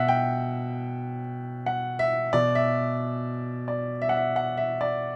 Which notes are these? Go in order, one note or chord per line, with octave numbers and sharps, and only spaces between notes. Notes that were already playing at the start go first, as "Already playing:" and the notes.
Already playing: B2 E5 F#5
G5
F#5
E5
B2 D5
E5
D5
E5
F#5
E5
F#5
E5
D5